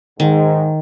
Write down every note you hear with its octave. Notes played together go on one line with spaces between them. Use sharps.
G#2 D#3